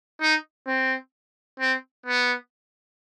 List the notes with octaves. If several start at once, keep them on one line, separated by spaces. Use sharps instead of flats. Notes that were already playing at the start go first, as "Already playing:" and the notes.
D#4
C4
C4
B3